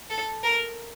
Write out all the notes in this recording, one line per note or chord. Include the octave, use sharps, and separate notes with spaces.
A4
A#4